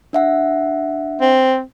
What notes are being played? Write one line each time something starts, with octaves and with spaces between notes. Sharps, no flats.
D4 E5 F#5
C4